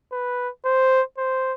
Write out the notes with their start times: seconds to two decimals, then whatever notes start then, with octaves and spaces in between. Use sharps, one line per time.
0.12 B4
0.65 C5
1.18 C5